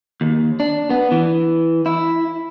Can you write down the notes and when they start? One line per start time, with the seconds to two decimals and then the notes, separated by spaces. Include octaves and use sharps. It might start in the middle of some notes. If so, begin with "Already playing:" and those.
0.21 D#2
0.60 D4
0.90 B3
1.12 E3
1.86 E4